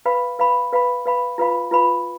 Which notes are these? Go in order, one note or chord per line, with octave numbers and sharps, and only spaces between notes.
B4 F5 B5
B4 F5 B5
B4 F5 B5
B4 F5 B5
F4 B4 F5 B5
F4 B4 F5 B5